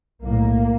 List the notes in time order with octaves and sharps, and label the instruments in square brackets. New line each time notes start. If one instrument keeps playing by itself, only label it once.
[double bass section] B1 A2 A#3